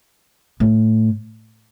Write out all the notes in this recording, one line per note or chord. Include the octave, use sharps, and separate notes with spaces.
A2